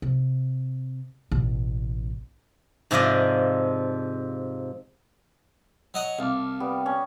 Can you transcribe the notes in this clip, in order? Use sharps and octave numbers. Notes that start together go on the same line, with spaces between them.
C3
A1 B2
G#2 C3 F3 D5 D#5
F#3 D#5 F#5
C2 F5 A5 D6
G3 B3
C#4